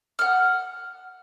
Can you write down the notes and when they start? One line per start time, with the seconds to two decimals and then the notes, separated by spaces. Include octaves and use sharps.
0.19 F#5 F6